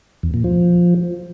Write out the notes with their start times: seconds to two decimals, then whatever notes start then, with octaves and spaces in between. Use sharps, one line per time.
0.23 E2
0.34 A#2
0.44 F3